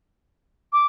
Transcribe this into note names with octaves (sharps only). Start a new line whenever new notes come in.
D6